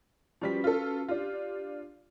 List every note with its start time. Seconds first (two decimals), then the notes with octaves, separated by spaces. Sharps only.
0.42 F3 G3 C#4 F#4 B4 B6
0.64 F4 A4
1.09 D4 F4 G4